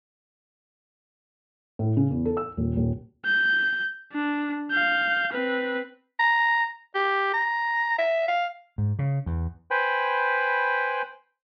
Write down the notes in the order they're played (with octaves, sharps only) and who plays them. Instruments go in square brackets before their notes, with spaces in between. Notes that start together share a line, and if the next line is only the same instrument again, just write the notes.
[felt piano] A2
C#3
E2
A4
E6
D#1
D#1
[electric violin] G6
D4
F5 G6
C4 B4
[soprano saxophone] A#5
G4
A#5
E5
F5
[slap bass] G#2
C#3
E2
[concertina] B4 C5 G5 G#5 B5